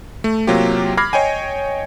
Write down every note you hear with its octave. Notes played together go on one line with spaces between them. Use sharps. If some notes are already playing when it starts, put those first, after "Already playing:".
A3
C3 F#3 A#3 F4 G4
B5 D6 F6 G#6 A#6 C7
C#5 D#5 G5 G#5